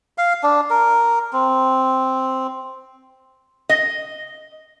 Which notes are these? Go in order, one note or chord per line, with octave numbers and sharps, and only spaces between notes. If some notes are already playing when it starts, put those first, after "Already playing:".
F5
D4
A#4
C4
D#5